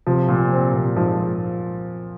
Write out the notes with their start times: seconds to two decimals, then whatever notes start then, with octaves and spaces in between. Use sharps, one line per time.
0.07 C3 F3
0.28 A#2
0.52 C4
0.74 A#2
0.96 G#2 F3